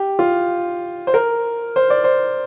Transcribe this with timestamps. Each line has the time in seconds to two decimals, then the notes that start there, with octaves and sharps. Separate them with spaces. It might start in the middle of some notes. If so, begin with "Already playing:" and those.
Already playing: G4
0.19 F4
1.07 C5
1.14 A#4
1.76 C5
1.90 D5
2.04 C5